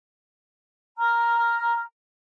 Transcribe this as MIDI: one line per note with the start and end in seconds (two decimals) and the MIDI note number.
0.97 1.82 82
0.97 1.82 89